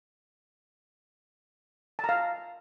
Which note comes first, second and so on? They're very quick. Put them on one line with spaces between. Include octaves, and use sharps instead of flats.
A5 A#5 F5